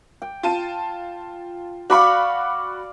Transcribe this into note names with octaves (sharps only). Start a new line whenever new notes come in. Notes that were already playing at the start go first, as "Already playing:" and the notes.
G5
F4 A5 D#7
F#4 D5 F5 B5 C#6